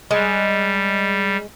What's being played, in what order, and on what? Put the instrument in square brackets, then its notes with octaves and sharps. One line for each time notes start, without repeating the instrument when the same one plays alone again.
[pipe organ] G3 [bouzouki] G#3